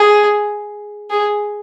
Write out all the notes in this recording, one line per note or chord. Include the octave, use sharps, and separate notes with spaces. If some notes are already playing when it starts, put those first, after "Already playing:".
Already playing: G#4
G#4